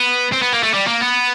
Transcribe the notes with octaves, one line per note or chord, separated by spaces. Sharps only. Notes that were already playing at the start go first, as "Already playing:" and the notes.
Already playing: B3
C4
B3
A#3
A3
G3
A#3
B3